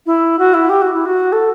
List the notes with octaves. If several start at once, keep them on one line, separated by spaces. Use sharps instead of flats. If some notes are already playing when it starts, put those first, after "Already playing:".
E4
F#4
E4
G4
F#4
E4
F#4
A4